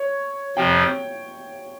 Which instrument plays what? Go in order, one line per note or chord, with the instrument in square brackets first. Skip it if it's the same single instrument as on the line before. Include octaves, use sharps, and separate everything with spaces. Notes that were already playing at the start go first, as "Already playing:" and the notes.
Already playing: [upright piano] C#5
[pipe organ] F2 C3 F3 [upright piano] G5